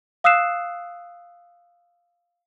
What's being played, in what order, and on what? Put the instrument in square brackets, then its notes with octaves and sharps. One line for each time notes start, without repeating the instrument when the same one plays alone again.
[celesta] F5 D#6 E6 F#6 C7 E7